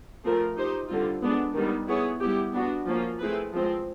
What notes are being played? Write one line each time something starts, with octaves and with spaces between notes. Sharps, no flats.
F3 A3 C4 F4 A#4
D#4 G4 C5
D3 G3 C4 F4
G#3 B3 D4
D#3 G3 B3
B3 E4 G#4 C#5
G3 B3 E4 G4
B3 D4 F#4
F3 A#3 C#4 F4
A3 C4 E4 G#4 B4
F3 G#3 C4